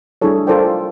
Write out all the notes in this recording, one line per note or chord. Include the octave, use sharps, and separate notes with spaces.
G3 D4 E4 G#4 A4 C#5
F4 A4 A#4 C5 D5 G5